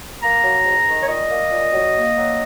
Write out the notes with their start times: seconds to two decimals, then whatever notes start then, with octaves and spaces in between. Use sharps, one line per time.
0.22 A#3 A#5
0.43 F#3
0.65 G#2
0.87 D#3
1.02 C#5
1.08 A#2 D#5
1.30 A#3
1.51 A#2
1.73 F#3
1.94 A#3
2.16 F#3